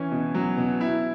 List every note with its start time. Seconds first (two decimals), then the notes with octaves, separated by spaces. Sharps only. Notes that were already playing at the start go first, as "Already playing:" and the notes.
Already playing: E3 C#4
0.11 B2
0.34 F#3
0.57 B2
0.81 E4